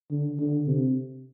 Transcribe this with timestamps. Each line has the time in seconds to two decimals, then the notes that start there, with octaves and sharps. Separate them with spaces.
0.11 D3
0.40 D3
0.67 C3